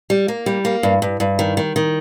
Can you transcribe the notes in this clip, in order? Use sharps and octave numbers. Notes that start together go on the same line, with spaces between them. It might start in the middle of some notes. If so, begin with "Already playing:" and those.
G3
A#3
G3
A#3
G2
G2
G2
D#3
D#3
D#3